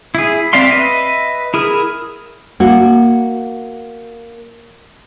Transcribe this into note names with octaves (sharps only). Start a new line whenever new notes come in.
E4 G#4
C4 D5 E5 F5 C6
B4 D#5 E5
E4 G#4 A#4
A#3 F#4